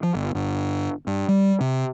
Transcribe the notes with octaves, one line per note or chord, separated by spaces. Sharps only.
F3
G1
G1
G2
G3
C3